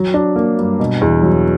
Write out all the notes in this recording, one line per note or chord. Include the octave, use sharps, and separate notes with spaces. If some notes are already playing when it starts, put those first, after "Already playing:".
Already playing: F#3 A#5
D4
A#3
G2
B2
E2
F#3